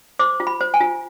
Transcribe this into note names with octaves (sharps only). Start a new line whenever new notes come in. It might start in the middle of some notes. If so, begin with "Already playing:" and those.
C5 D6
F4
B5
C5
G#5
F4